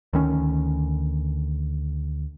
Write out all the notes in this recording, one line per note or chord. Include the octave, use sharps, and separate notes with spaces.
D2 D#3 C#4